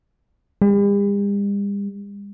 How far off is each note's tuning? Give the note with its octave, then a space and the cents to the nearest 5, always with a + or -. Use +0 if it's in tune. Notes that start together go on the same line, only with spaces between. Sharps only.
G3 +45